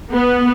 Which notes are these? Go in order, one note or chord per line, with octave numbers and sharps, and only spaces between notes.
B3